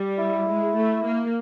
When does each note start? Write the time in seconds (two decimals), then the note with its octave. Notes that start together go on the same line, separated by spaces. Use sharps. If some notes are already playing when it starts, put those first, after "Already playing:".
Already playing: G3
0.18 E4
0.47 G#3
0.76 A3
1.05 A#3